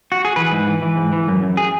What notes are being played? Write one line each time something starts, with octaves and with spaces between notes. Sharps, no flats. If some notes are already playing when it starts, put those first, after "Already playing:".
F#4
G#4
E3 B4
G#2
E3
E3
G#2
E3
F#2
F#2
G#4